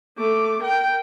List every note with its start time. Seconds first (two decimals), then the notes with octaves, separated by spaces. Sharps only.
0.18 A3 D6
0.62 A#4 G5